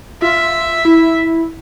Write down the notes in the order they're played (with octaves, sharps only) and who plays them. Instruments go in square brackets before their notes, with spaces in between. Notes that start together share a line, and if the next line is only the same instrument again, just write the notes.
[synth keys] F4 [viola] E5
[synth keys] E4